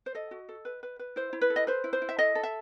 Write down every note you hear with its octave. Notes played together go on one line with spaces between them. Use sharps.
C5
A4 D#5
F#4
A4
B4
B4
B4
E4 C5
E4
B4
A4
D#5
B4 C5
E4
C5
E4
E5
A4 D#5
A4
E5